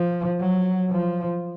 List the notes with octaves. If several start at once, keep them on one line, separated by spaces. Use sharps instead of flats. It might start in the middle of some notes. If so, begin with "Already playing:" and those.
Already playing: F3
F#3
F3